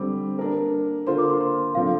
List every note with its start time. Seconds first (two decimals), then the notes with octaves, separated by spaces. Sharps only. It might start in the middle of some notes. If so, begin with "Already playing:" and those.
Already playing: D3 G3 C4 D6
0.39 A#3 D4 A#4
1.07 D3 A#3 F4 C5 C6
1.18 D6
1.30 C6
1.41 C6
1.74 D3 F3 C4 F5